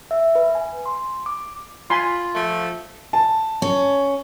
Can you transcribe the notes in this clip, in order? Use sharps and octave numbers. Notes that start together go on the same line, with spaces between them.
E5
B4
G#5
C6
D6
F4 G#5 B5 C6
F3 A3
A5
C#4